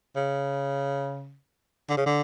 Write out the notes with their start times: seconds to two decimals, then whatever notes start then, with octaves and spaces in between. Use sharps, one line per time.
0.16 C#3
1.89 D3
1.97 C#3
2.06 D3